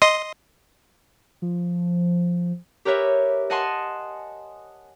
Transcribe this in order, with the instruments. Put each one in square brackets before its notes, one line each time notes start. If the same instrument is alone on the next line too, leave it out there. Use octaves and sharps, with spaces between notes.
[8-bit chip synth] D#5 C6 D#6
[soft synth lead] F3
[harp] G4 A#4 B4 C#5 E5
D#5 F#5 G#5 A5 C6